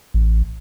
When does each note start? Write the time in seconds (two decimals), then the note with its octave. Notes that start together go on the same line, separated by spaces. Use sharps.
0.14 A1